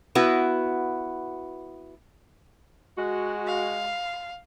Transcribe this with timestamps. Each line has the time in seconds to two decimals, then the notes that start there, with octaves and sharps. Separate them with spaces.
0.15 B3 E4 F#4 B4
2.98 G#3 F#4
3.47 F5